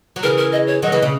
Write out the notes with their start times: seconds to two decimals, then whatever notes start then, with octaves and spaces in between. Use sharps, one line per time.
0.16 F#3
0.23 C#3 E3 A#4
0.37 A#4
0.53 D#5
0.67 C#5
0.82 D#3 F#3 D#5
0.92 C#3 E3
1.02 C#3